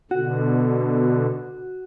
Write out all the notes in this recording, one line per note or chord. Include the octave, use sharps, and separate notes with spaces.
B2 D3 F#4